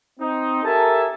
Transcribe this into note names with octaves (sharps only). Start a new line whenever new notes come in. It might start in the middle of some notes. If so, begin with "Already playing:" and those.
C4 D#4
G4 A4 A#4 E5 G#5 A5